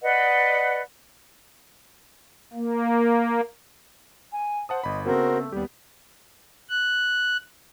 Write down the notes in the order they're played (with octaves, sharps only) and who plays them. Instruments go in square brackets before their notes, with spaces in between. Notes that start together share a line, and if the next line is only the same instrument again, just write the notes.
[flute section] B4 D5 D#5 F#5
[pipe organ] A#3
[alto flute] G#5
[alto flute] C5 [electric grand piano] F#5 A5 D#6
[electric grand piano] G1 B5 [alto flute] D#5
[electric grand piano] C#3 B3 C4 [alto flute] A3 [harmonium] F#4 A#4 C5
[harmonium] D#2 G3 [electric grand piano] B3 G4
[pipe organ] F#6